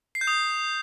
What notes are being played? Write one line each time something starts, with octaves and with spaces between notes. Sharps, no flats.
C7
G6
D#6